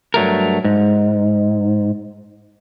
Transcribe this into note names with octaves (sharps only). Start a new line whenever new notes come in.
G2 F#3 A3 A#4
G#2